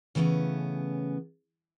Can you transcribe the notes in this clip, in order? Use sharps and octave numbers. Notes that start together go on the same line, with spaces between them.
C#3 E3 A3 B3 C#4